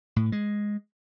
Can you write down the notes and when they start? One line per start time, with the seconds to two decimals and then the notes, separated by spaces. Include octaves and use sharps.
0.16 A2
0.32 G#3